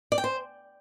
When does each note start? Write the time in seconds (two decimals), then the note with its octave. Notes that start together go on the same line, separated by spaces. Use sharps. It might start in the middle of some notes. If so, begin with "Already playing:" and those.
0.12 D5
0.18 G5
0.24 C5